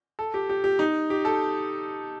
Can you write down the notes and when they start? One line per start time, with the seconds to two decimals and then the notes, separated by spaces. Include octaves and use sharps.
0.19 A4
0.34 G4
0.50 G4
0.64 G4
0.79 D#4
1.10 G4
1.25 A4